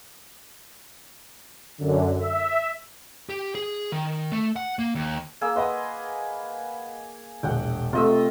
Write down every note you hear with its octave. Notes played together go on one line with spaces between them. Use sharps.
F#2 D3
E5
G4
G#4
D#3
A3
F#5
A#3
D#2
A#3 G#4 E6
B4 D#5 F#5 C6 D#6
E1 A#1 F#5 G5
C3 A3 F4 D#5 E6